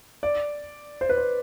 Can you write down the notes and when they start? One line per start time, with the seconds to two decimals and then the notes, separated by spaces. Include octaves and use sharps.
0.23 D5
1.01 C5
1.09 B4
1.18 C5